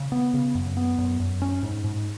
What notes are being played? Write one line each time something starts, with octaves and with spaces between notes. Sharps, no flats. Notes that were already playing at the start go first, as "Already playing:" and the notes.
Already playing: C#3
B3
C#3
F#2
B3
F#2
F#2
C#4
G#2
G#2